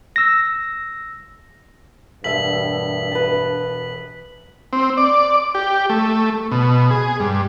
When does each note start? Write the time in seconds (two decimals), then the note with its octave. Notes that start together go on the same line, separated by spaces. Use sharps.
0.16 E6 A#6
2.24 E1 G2 E5 B6 F#7
3.12 B4 A5
4.73 C4
4.97 D5
5.55 G4
5.90 A3
6.51 B2
6.91 G#4
7.20 G2